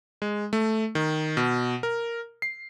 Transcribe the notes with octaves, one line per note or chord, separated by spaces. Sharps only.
G#3
A3
D#3
B2
A#4
C7